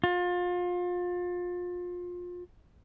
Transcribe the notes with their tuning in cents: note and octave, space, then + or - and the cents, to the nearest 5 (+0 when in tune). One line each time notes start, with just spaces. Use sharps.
F4 +30